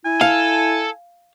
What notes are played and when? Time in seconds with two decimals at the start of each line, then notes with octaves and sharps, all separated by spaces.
0.05 E4 G#5
0.21 A4 F5